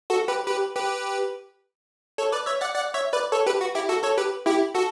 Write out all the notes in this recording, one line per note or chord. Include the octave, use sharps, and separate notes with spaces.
F#4 A4
G4 B4
G4 B4
G4 B4
A4 C#5
B4 D5
C#5 E5
D5 F#5
D5 F#5
C#5 E5
B4 D5
A4 C#5
G4 B4
F#4
E4 G4
F#4 A4
A4 C#5
G4 B4
E4 G4
F#4 A4